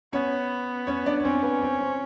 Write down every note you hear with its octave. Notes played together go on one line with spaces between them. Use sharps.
B3 C#4 C#5
C#4 C#5
D4 D5
C#5
C4 C#4 C5
B3 B4
C4 C5
C4 C5